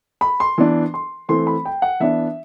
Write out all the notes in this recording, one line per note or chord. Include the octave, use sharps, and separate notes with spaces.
B5
C6
E3 B3 D4
C6
E3 A3 C4 C6
B5
G5
F#5
E3 B3 D4 E5